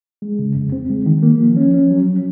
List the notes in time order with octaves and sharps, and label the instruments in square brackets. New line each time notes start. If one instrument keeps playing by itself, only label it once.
[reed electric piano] G#3
C#3
F2
C4
G#3
D#3
A#3
F3
C#4
C#4
F#3